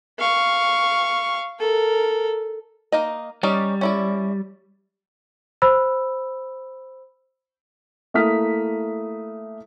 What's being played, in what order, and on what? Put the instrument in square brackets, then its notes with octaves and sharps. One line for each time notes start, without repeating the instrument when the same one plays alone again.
[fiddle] F5 C#6
A4 A#4
[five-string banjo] A#3 D#4 D#5
[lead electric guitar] G3 [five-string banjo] C#4 D#4 D5
[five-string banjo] C#4 E4 D5
[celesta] C5 B5 E6
[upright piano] A3 A#3 E4 D#6 F6 B6